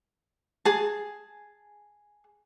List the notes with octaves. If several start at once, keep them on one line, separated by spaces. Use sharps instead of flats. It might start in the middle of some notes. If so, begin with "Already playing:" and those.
G#4 A5